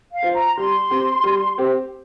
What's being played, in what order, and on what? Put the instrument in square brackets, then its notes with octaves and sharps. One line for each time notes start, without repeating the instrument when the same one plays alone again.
[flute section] F5
[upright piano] F4 C5
[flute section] A#5
[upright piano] G3 [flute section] C6
[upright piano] C4 G4 C5
G3
C4 G4 C5